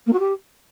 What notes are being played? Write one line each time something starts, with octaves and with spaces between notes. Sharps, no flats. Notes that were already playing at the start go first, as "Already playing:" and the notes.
A#3
F#4
G4